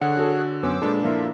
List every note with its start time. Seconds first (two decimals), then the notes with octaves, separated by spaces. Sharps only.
0.01 D3 G#4 C#5 F#5 F#6
0.17 F#4 A4
0.63 F#2 B3 C#4 C5 D6 E6
0.82 A#2 G#3 D4 A4 B4
1.03 F3 A#3 E4 F4 A4 E5